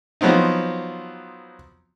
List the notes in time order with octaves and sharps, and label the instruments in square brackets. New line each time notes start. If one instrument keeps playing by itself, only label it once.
[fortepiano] F3 F#3 B3 C4 D#4